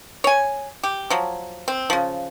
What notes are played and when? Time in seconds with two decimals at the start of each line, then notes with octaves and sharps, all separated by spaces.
0.24 C#5 G#5
0.83 G4
1.10 F3 F#3
1.68 C4
1.90 C#3 F3